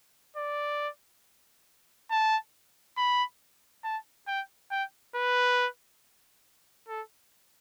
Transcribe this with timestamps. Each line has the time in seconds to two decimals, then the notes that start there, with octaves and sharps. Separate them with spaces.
0.36 D5
2.10 A5
2.97 B5
3.84 A5
4.27 G5
4.71 G5
5.15 B4
6.88 A4